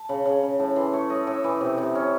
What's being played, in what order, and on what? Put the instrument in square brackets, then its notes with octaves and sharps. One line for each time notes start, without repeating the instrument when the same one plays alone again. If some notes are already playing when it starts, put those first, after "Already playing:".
Already playing: [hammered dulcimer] A5
C#3
C#3
C#3
A2 A5
E3 C6
A3 C#5
A3 D#5
A2 E5
E3 D#5
C3
C3
C#4